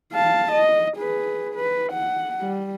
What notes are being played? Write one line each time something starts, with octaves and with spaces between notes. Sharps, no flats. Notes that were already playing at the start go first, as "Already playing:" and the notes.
F5 A5
D#5
G#4 B4
B4
F#5
G3